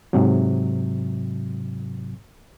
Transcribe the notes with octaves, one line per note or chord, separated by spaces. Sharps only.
G#2 C3 F#3